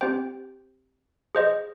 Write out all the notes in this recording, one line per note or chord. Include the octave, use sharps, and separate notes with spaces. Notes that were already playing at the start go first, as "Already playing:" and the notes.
C4 G4 C5 G5
G#4 C5 D#5